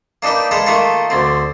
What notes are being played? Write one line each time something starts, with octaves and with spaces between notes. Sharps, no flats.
A#3 D4 D#4 B4 G5
G#3 A4 B4 F5 D#6
D#3 A3 A#3 F4 A4
D2 C4